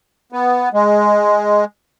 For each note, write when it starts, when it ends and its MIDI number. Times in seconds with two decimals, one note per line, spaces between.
0.32 0.69 59
0.73 1.64 56